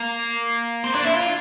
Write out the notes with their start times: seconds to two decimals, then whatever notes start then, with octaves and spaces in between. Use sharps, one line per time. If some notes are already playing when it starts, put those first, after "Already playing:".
Already playing: A#3
0.84 C4
0.95 D4
1.05 E4
1.15 F4